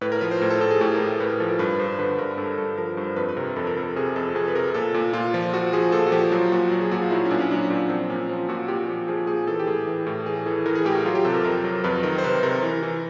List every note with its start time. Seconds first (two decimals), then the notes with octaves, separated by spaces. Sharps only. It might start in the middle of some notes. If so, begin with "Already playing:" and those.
0.01 A2 B4
0.12 A#4
0.21 F3 B4
0.31 C5
0.42 A2
0.50 A4
0.60 A2 A4
0.71 G#4
0.81 A2 G4
0.95 A#4
1.00 A2 A4
1.20 A2 B4
1.30 A#4
1.40 F3 A4
1.49 A#4
1.59 G2 B4
1.79 G2 C5
1.99 D3 B4
2.18 G2 A#4
2.38 G2 A4
2.58 G2 A4
2.78 F3 A#4
2.97 G2 C5
3.16 F2 B4
3.29 B4
3.37 C3 A#4
3.56 F2 A4
3.67 A#4
3.76 F2 A4
3.96 C3 G#4
4.16 F2 A4
4.35 F2 G#4
4.48 B4
4.55 C3 A#4
4.74 A#2 A4
4.94 A#2
5.13 A#2 F4
5.34 F3
5.53 F3 F#4
5.73 F3 G#4
5.92 A#2 A4
6.07 F#4
6.12 F3 G4
6.32 F#3 F4
6.52 A#2 F#4
6.71 F#3
6.81 G#4
6.91 A#2 F#4
7.02 F4
7.11 F#3 E4
7.25 C#4
7.31 A#2 D4
7.41 C#4
7.51 F#3 D4
7.70 A#2
7.89 F3 C4
8.10 A#2 C#4
8.29 F3
8.49 A#2 F#4
8.68 A#2 G4
8.88 F3
9.08 F3 G#4
9.27 A#2 G#4
9.47 E3 A4
9.60 G4
9.67 A2 G#4
9.87 E3
10.07 A2
10.26 E3 G#4
10.46 E3 A4
10.66 E3 A#4
10.75 G#4
10.85 A2 G4
10.95 F#4
11.05 F#3 F4
11.15 G4
11.25 C3 A4
11.34 A#4
11.44 F2 A#4
11.64 F#3
11.84 F2 B4
12.03 D#3 A#4
12.18 C5
12.23 C3 B4
12.43 C3 A#4
12.63 E3
12.83 E3